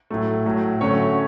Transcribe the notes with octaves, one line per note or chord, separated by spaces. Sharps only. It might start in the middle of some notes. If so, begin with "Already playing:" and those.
A2 F#3 A3
A2 F#3 A3
D3 F#3 A3 C#4 C#5